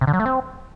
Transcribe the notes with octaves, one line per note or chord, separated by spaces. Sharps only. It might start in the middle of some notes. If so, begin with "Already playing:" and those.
C3
D3
F#3
A3
C4